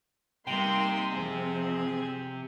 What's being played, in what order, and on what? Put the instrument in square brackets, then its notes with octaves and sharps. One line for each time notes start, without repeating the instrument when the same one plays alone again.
[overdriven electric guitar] C3 [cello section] G3 A#3 [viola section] D#4 C6 [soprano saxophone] G5
[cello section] F2 F3 [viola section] C4 [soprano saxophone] G#4